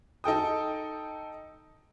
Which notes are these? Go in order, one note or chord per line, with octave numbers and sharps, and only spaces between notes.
D#4 A4 G5 D#6